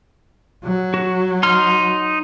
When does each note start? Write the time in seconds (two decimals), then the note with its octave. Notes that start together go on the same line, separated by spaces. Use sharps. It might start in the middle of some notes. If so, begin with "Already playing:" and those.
0.64 F#3
0.94 F#4
1.43 D#4 C6 F6